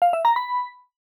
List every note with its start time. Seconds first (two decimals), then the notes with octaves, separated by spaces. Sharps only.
0.02 F5
0.13 E5
0.25 A#5
0.36 B5